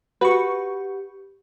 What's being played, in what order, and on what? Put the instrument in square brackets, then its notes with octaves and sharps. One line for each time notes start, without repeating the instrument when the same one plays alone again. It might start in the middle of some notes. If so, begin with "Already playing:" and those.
[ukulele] F#4 [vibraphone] G4 [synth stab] B4 C#6